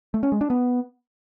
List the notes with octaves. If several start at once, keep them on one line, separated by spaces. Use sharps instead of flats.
A3
C#4
G#3
D4
B3